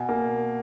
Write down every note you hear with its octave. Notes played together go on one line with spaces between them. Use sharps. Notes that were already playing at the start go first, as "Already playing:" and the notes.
Already playing: B2 G#5
A#3